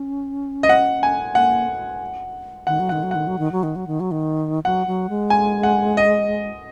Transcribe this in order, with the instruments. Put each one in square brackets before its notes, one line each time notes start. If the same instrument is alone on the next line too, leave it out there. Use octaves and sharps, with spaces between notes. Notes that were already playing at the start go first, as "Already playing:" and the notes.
Already playing: [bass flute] C#4
[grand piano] D#5
F#5
G#5
[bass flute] A#3 [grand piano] F#5
[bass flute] D#3 [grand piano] F#5
[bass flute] F#3
[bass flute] D#3 [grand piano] F#5
[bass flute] F#3
[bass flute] D#3 [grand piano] F#5
[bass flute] F#3
D#3
F#3
D#3
F#3
D#3
F#3
D#3
[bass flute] F#3 [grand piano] F#5
[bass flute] F#3
G#3
[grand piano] G#5
F#5
D#5